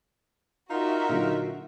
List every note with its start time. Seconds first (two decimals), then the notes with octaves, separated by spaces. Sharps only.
0.71 D#4 F4 F#4 A#4 E5
1.09 A#2 D3 F#3